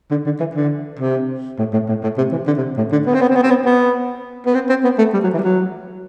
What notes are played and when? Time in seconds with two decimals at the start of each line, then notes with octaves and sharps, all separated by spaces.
0.11 D3
0.26 D3
0.40 E3
0.55 D3
0.99 C3
1.58 A2
1.73 A2
1.89 A2
2.03 A2
2.18 C3
2.32 E3
2.47 D3
2.58 C3
2.77 A2
2.92 D3
3.06 B3
3.14 C4
3.21 B3
3.29 C4
3.35 B3
3.43 C4
3.50 B3
3.65 B3
4.46 B3
4.54 C4
4.69 C4
4.84 B3
4.98 A3
5.13 G3
5.23 F#3
5.33 E3
5.39 G3
5.43 F#3